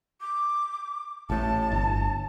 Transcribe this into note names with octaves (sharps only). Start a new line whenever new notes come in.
D6
A1 A2 A5
G1